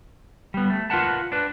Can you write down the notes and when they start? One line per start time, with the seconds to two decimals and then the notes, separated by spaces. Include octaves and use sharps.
0.54 G3 B3
0.70 A3
0.90 F4 A#4 B4 F#5 A5
1.32 D4 B4